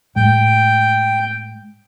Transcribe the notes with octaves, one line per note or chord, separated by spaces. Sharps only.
A2 G#3 G5